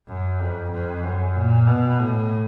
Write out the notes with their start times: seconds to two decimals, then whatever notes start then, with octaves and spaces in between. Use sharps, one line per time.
0.08 F#2
0.40 F2
0.72 F2
1.04 F#2
1.35 A#2
1.68 B2
1.99 A2